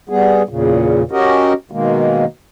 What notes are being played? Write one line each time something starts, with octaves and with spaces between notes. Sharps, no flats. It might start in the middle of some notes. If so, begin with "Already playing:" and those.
G3 B3 G#4
E2 A#2 C#3
C#4 F#4 G4 A#4 D#5
B2 D#3 G#3 A#3